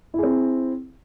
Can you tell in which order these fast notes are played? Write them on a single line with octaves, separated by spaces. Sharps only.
E4 G#4 C4